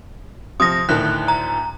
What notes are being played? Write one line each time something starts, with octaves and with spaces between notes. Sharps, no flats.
C3 F3 D#6 A#6
D2 A2 D#3 F#6
A#5